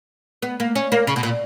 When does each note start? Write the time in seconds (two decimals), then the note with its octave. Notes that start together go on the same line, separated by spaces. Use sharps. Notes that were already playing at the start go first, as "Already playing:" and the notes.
0.42 B3
0.60 A#3
0.75 C#4
0.92 A#3
1.07 C#3
1.16 B2
1.23 A#2